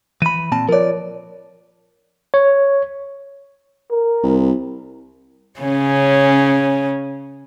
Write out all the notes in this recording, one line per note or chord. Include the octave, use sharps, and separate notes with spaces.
E3 B5 D#7
A#2 C4 A5
F3 A#4 C#5 D5
C#5
A#4
C2
C#3 C#4